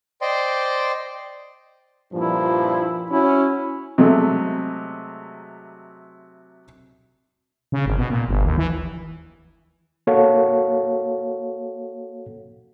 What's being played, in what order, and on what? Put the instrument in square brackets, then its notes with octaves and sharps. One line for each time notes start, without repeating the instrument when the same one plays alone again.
[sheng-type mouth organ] C5 D5 D#5 G5 C6
[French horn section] G2 A#2 F3 [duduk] E4
[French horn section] C#4 F#4 [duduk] E4
[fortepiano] C3 F#3 G#3 A3
[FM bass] C#3
G#1
B2
A#2
G1
D#2
E3
[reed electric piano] A#3 F#4 A4 C#5 F5 F#5